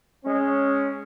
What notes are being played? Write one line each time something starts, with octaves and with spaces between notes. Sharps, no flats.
G#3 C#4